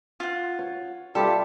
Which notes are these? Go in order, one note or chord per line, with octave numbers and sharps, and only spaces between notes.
F4 F#5
C#5
G3 F4 G4 A4 E5